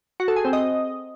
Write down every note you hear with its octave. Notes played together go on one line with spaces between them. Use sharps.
F#4
A4
G#4
C4
D#5